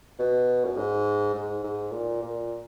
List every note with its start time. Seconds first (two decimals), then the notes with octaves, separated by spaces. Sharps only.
0.19 B2
0.65 F#2
0.77 G#2
1.34 G#2
1.64 G#2
1.92 A#2
2.22 A#2